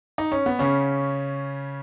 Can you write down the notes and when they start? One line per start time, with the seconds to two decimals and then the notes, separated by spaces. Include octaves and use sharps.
0.18 D#4
0.32 C#4
0.46 B3
0.59 C#3 C#4